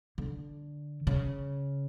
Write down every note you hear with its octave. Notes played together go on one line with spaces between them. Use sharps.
D3
C#3